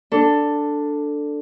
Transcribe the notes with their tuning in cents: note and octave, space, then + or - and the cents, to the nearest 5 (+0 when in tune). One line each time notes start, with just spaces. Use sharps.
D4 +0 A4 +10